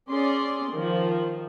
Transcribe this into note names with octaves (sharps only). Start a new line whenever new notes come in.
C#4 G#4 D5 C6
D#3 F3